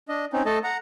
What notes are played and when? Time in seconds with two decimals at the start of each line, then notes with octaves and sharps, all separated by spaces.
0.09 D4 D#5
0.33 C4 C#4 D#4
0.46 A3 A4 D#5 A5
0.64 F#5 A#5